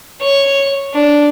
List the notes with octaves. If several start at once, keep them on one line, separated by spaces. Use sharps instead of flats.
C#5
D4